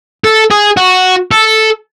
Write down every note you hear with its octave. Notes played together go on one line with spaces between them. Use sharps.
A4
G#4
F#4
A4